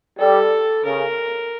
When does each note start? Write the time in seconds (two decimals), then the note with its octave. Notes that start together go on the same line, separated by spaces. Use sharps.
0.19 G3 A4
0.85 C#3 A#4